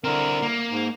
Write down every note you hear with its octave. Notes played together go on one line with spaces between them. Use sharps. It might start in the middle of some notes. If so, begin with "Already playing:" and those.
D3 C4 E4 A#4
A#3
G#2